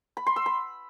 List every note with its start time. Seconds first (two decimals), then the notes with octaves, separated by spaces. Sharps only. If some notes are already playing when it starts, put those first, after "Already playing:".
0.17 B5
0.27 C6
0.36 E6
0.46 B5